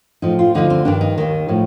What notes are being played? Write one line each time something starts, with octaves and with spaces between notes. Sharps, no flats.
A2 F3 D#4
F4
D2 D3 F3 D#4
C4
G2 D#3 D4
D#4
D#2 D#3
A2 F3